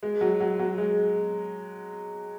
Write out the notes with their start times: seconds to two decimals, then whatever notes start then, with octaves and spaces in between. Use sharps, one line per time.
0.03 G#3
0.21 F#3
0.40 F#3
0.59 F#3
0.78 G#3